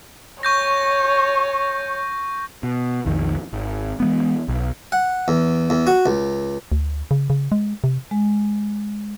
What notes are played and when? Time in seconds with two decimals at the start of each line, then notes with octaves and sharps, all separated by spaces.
0.43 C#5 C#6 G6 A#6
2.63 B2
3.06 B1 F2 D#3
3.53 G#1
4.00 E3 G#3 B3
4.48 B1
4.92 F#5
5.28 E2
5.70 E2
5.87 F#4
6.06 C#2
6.72 D2
7.11 C#3
7.30 C#3
7.52 G#3
7.84 C3
8.11 G#3